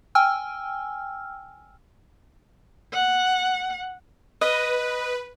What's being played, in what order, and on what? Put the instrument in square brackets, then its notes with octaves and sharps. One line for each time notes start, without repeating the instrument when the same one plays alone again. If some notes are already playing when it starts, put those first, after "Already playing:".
[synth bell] G5 G#5 E6 F6
[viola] F#5
[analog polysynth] B4 [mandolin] D#5